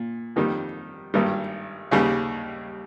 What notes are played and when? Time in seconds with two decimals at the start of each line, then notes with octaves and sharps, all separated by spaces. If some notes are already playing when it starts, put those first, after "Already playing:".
Already playing: A#2
0.36 F2 D#3 G3
1.14 G#1 G2 D#3 G3
1.91 D#2 C#3 G3